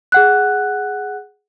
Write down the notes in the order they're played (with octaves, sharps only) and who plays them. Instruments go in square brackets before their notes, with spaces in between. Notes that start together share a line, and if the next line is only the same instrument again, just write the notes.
[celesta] G#4 F#5 F#6